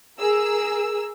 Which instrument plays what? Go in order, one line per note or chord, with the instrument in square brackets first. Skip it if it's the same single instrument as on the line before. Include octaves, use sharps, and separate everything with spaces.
[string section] G#4 A#4 E6